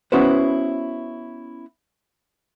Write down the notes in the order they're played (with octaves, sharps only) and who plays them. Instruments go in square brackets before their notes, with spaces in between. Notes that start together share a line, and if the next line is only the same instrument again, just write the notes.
[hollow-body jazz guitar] B3 C#4 E4 F#4 B4 C5